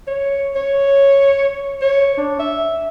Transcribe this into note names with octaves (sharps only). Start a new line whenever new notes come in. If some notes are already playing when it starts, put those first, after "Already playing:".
C#5
C#5
C#5
D4
E5